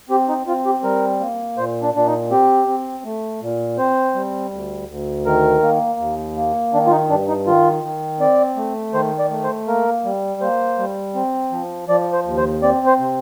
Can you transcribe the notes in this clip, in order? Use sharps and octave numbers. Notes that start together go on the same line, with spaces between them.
C4 G4
D#4
C4 F4
G4
G3 A#4
A#3
A#2 C5
D4
A#2 D4
D#4
C4 G4
C4
A3
A#2
C4 C5
G3
D2
D2
D#3 A#4
A#3
D#2
A#3
D#3 D4
F4
D#4
G2 D4
D#4
D#3 F4
D#3
C4 D5
A3
D#3 C5
D5
A3
C5
A#3 A#4
G3
A#3 C5
G3
C4
F3
F3 D5
C5
D#2
C5
C4 D5
C5
C3